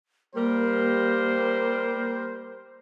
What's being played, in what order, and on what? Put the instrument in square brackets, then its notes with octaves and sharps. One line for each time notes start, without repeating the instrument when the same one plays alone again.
[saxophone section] G3 A#4 [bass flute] A#3 [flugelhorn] C5